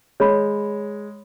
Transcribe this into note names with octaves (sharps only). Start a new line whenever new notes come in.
G#3 C#5 B5